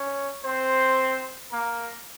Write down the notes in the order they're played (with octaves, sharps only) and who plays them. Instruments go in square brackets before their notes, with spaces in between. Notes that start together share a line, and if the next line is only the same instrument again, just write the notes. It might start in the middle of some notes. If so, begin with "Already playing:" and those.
Already playing: [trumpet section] C#4 C#5
C4 C5
A#3 A#4